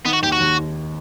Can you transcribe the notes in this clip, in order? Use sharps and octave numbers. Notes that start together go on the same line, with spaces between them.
D#3 B3
F#4
D#2 G4
F#4
D#2
D#3